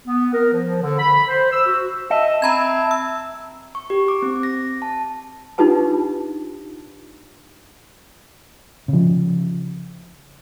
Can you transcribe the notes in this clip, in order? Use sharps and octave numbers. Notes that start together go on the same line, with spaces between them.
B3
A#4
F3
D3
B5
C5
E6
F#4
D#5 E5 A5
C4 A#5 B5 G#6
E6
C#6
G4
D6
C4
A#6
A5
D4 D#4 F4 G4 B4 A5
C#3 F3